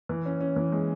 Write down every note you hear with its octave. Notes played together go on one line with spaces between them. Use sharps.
E3
C#4
C#4
E3
G#3